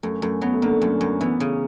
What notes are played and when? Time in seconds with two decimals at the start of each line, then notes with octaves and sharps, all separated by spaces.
0.03 F#2 A3
0.22 F#2 A3
0.42 F#3 B3
0.54 A3
0.62 D3 A#3
0.81 F#2 A3
1.01 F#2
1.21 E3 B3
1.40 C#3